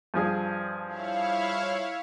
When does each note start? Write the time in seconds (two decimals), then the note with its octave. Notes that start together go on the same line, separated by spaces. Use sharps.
0.14 G2 F3 G#4
0.86 E4 C#5 F5